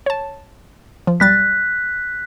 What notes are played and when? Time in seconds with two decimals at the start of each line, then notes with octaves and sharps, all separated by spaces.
0.06 C#5 A5
1.07 F3
1.20 B1 G3 F#6 A6 B6